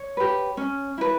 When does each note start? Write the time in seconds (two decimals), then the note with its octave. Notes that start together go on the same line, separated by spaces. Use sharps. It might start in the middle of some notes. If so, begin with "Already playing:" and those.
Already playing: C#5
0.17 G4 B4
0.57 C#4
0.98 E4 B4